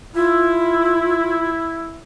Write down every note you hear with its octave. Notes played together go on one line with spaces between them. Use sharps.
E4 F4